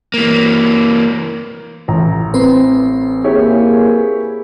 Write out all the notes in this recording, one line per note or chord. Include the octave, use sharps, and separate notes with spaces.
E3 A#3
A1 A#5
C4 B4 C5
A#3 E4 G4 G#4 C#5